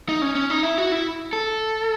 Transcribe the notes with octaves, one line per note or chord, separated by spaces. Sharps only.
D#4
C#4
C#4
D#4
E4
F#4
E4
A4